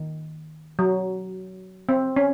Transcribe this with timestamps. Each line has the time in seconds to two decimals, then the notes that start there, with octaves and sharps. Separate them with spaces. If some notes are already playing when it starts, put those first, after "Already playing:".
Already playing: D#3
0.79 F#3
1.89 C4
2.16 C#4